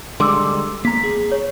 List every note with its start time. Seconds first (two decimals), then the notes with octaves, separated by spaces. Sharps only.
0.20 D3 G3 G#3 C6 D6 E6
0.85 A#3 A#5 B6
1.04 G#4
1.32 C#5